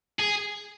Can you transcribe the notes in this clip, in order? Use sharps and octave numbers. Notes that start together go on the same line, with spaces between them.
G#4